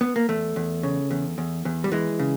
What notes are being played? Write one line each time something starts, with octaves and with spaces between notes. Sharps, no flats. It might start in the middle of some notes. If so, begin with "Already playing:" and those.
B3
A#3
E2 A3
E2
C#3
E2
E2
E2
G3
E3 G#3
C#3